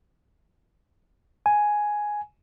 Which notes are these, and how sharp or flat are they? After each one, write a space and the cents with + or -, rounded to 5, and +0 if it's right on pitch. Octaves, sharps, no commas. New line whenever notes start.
G#5 +5